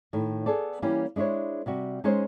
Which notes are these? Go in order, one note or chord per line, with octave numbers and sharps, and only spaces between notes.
A2 D#3
B3 G#4 A4 D5
E3 G3 A#3 C#4 G4
G#3 D4 E4 C5 C#5
C3 G3 F#4
G#3 C#4 D#4 C5 C#5